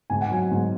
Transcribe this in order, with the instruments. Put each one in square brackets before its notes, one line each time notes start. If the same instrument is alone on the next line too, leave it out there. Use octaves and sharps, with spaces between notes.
[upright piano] G#2 G#5
F#5
F#3 G#5
G#2